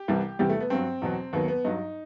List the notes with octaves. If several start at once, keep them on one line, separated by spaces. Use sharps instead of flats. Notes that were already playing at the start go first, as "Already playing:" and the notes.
Already playing: G4
C2 C3 E3 G3
E2 C3 E3 G3 G4
A3
B3
G2 F#3 C4
E2 B2 F#3
D#2 D#3 F#3 B3
B3
G2 F#3 D#4